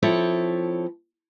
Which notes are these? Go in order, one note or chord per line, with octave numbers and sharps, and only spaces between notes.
F3 C4 E4 A4 C#5